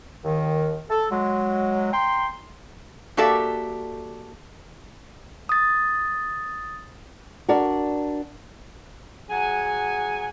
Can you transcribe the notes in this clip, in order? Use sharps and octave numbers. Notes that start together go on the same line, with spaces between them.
D#2 D#3
A4
F#3 G#3
G5 A#5 C6
A#3 F#4 G4 A4 D5 E5
D#6 A6
D4 F#4 A#4 D5
F#3 G#4 F#5 G#5